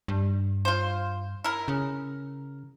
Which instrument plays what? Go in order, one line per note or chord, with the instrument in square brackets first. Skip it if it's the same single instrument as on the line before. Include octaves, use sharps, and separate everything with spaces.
[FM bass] G2
[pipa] F4 C5
E4 A#4
[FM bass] C#3